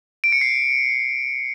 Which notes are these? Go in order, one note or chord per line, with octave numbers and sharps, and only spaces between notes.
D7
C#7
C7